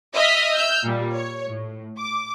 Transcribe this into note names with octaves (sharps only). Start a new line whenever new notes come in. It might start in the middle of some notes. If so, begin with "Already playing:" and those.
D#5 E5 D#6 F6 B6
E6 F6 G6
A#2 G3
C#5
A2
D6